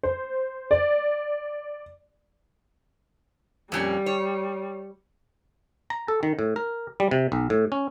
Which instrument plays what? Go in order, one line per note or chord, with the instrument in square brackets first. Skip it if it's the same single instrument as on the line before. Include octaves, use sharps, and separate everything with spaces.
[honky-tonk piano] C5
D5
[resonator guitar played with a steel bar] F2 A#2 C#4 [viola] G3
[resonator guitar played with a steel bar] C#5
[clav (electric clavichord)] A#5
A4
D#3
A2
A#4
G3
C3
B1
A2
C#4